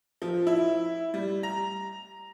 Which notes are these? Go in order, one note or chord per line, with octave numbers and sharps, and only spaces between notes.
F3
E4
G3
A#5